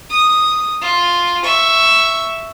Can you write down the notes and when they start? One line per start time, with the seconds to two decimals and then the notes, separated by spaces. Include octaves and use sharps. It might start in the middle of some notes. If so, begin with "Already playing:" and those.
0.10 D#6
0.81 F4
1.43 E5 C#6